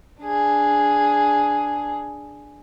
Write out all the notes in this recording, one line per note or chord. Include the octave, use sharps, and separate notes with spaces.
D4 G#4